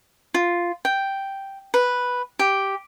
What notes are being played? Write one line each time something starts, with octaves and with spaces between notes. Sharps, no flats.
F4
G5
B4
G4